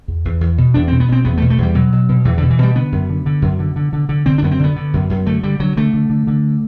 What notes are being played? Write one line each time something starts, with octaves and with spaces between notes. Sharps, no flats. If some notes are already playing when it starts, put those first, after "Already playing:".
E2
E2
E2
B2
E2 D4
B2 C4
B3
B2 C4
E2 B3
A3
B2
A3
E2 G3
B2 F#3
B2
B2
E2 E3
B2 D3
E3
B2 G3
D3 B3
F#2
D3
D3
F#2
D3
D3
D3
D3
D3 C4
D4
F#2 B3
C4
D3 B3
D3
F#2
F#2
D3 A3
D3 G3
D3 F#3
D3 A3
D3
D3
D3